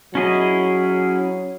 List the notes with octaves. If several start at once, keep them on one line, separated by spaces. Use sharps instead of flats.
F#3 C#4 E4 G#4 D#5